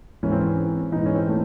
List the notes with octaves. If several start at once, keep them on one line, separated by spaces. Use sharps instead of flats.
G#2 E3 C#4
C4
C#4
G#2 E3 D#4
C#4
C4
A3